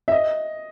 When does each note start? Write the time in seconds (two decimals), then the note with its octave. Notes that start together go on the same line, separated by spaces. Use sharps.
0.08 E5
0.12 D#5